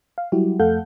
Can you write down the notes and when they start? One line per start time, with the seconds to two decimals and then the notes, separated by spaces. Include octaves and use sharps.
0.18 F5
0.32 F#3 G3 E4 F#4 G4
0.59 F2 A3 A4 F5 F#5 G6